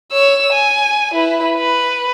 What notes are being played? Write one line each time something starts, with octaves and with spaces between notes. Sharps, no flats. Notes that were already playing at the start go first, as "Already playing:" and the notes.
C#5 E6
G#5
E4 B4
B4